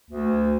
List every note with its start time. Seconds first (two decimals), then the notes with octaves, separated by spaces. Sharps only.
0.10 D2